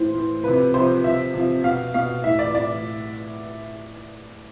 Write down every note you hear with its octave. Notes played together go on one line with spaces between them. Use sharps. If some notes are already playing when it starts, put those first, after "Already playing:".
Already playing: A2 E3 C5
A2 E3
C3 F3 B4
C3 F3 C5
C3 F3 E5
C3 F3
B2 F5
B2 F5
A2 E3 E5
D5
A2 E3 D5